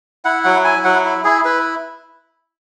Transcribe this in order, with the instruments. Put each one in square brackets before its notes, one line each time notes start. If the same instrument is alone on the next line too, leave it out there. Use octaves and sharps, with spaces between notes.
[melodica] E4 F#5
F#3 F#5
E4 G#5
F#3 F#5
E4
E4 G#4
E4 B4